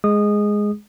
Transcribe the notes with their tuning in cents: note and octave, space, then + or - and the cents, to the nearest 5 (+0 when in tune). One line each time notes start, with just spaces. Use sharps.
G#3 +0 G#4 +0 D#6 -20